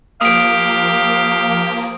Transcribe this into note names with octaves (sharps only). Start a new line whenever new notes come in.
F3 A#3 G4 F5 D#6 D7